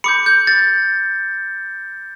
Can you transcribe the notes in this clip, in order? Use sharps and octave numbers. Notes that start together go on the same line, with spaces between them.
B5 D6 G6 C#7
G6
A6